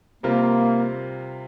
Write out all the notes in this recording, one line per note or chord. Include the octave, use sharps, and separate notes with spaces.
C3 G3 A#3 C4 F4 A#4